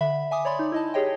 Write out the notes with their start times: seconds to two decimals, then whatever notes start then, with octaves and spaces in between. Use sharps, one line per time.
0.01 D3 E5 B5
0.31 E5 G#5 D6 D#6
0.45 C#5 D5 B5 C6
0.59 D#4
0.72 E4 D#5 A5
0.94 G4 G#4 C#5 D#5 G5